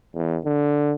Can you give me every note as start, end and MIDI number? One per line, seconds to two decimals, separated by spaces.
0.15 0.38 40
0.45 0.94 50